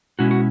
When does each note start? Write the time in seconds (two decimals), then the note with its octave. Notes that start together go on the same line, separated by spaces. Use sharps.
0.19 B2 G#3 C#4 E4 F#4
0.31 F#4